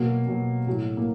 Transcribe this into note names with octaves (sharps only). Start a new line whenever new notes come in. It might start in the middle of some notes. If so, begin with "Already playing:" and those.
Already playing: B2 F#3 A#3
B2 F#3
A2 F#3
A#3